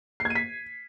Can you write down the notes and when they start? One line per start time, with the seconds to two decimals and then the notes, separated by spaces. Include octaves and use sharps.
0.20 C7
0.25 G#6
0.30 D#7
0.35 B6